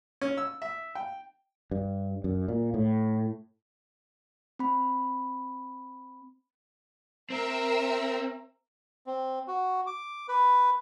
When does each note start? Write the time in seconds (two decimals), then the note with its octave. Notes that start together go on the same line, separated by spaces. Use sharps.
0.21 C#4
0.38 E6
0.62 E5
0.95 G5
1.71 G2
2.24 F#2
2.48 A#2
2.74 A2
4.59 C4 B5
7.30 C4 A#4 E5
9.06 C4
9.48 F#4
9.87 D6
10.29 B4